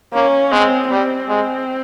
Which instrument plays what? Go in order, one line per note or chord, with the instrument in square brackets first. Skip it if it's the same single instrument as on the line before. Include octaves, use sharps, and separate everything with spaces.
[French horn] A#3 [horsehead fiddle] C#4
[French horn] G#3 [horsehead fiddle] C4
[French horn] G3 [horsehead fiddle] C4
[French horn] G#3